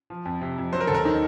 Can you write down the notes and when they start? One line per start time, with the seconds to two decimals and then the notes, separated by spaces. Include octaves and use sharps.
0.10 F3
0.25 F2
0.41 C3
0.58 F2
0.73 F#3 C5
0.81 A#4
0.87 D#2 A4
0.95 A#4
1.05 D#3